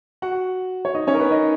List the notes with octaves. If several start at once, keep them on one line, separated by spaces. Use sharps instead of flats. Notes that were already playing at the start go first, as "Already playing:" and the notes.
F#4 F#5
C#5
D#4 D#5
C#4 C#5
A#4
B3 B4
D#4 D#5